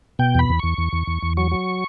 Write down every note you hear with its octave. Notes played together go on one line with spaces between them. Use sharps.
B2 G5
E2 B5
E2
E2 C#6
E2
E2
E2
E2
F#3 C#6
F#3